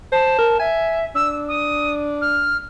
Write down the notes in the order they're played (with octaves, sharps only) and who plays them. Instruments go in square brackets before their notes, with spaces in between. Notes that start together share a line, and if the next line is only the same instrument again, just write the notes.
[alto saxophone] C5 [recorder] A5
[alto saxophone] A#4
[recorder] E5 [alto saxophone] G#5
[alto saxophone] D4 [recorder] E6
[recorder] D#6
F6